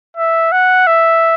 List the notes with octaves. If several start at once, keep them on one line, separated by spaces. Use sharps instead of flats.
E5
F#5
E5